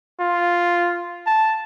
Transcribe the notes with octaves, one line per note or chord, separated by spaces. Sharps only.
F4
A5